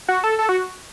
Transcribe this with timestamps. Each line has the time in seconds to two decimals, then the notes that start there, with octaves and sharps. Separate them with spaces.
0.08 F#4
0.24 A4
0.39 A4
0.49 F#4